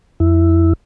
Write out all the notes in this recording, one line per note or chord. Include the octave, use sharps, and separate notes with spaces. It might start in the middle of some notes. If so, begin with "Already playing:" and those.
F2 E4